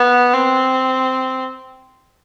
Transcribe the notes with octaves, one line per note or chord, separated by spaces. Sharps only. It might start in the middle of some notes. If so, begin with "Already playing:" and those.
Already playing: B3
C4